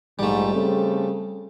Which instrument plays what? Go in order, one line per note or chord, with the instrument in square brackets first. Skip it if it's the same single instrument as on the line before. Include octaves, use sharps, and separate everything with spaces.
[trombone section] A#1 G#2 [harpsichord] G3 A3
[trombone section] C#3 C4 A4